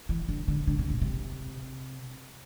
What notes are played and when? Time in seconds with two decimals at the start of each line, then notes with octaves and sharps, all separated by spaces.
0.09 E3
0.29 D3
0.48 D3
0.67 D3
0.79 C3
0.90 A#2
1.02 C3